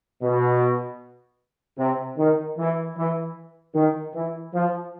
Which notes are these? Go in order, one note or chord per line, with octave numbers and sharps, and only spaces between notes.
B2
C3
D#3
E3
E3
D#3
E3
F3